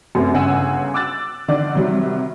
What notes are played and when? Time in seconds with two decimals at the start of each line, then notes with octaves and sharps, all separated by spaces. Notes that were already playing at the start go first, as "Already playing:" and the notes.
0.15 F#2 C3 A3 B3 C4
0.33 G1 C#3 F#5 G#5 E6
0.94 D6 E6 F#6 A6
1.48 D3 D#3 D4 D5
1.75 C3 D#3 F#3 G3